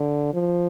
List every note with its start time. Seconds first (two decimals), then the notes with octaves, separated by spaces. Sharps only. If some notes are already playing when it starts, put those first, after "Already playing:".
Already playing: D3
0.34 F3